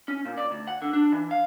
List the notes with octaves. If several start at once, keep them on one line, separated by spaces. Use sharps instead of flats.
C#4
A#2
D5
D2
F#5
D3
D4
E3
F5